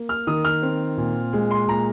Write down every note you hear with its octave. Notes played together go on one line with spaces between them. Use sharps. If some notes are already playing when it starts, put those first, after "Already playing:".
Already playing: A#3
F6
D#3 D#6
F6
C4
A#2
G#3
C6
A#2 A#5